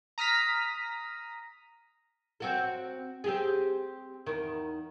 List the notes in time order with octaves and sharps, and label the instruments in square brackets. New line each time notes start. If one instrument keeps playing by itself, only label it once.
[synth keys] A#5 D#6 F6 A#6 B6
[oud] C4 F#4 A4
C4 G4 G#4
E2 D#3